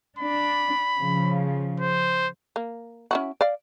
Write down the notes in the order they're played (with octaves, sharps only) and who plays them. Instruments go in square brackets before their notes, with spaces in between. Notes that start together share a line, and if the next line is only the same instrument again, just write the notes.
[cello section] D4 [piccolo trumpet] B5
[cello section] C#3 F3
[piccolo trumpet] C5
[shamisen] A#3
C#4 E4 F#4
D5 F5